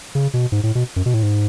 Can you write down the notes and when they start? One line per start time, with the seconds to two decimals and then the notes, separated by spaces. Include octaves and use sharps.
0.15 C#3
0.34 B2
0.52 G#2
0.63 A2
0.75 B2
0.96 F#2
1.06 B2
1.14 A2
1.23 G#2